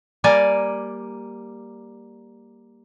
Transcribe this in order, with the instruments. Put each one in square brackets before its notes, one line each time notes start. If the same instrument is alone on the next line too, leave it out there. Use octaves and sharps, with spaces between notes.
[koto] G3 A#3 D5 G#5 A#5